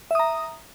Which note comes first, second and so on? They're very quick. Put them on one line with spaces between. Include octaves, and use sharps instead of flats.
E5 D#6 A#5